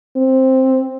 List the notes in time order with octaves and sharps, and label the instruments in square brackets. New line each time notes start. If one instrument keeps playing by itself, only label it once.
[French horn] C4